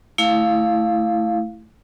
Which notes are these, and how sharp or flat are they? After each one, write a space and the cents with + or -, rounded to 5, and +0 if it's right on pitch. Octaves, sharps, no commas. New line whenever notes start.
A3 +0 E4 +0 F5 +0